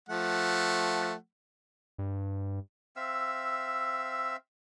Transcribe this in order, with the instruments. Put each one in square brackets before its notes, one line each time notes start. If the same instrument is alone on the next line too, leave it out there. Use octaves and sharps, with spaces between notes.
[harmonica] F3 A3 F#5
[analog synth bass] G2
[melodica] C4 E5 F5 E6